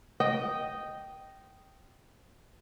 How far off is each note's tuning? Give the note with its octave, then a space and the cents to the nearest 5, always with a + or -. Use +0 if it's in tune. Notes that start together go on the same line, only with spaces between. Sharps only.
D#5 +0 G5 -10